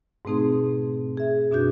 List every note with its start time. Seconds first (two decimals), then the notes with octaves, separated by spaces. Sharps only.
0.25 G#2 B2 A3 C4 D#4 G#4
1.17 G#4 E5
1.51 F#2 B2 D4 F#4 G6